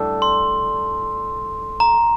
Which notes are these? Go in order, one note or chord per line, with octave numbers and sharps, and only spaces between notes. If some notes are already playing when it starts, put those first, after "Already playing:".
Already playing: A2 G3 D4 A4
C6
A#5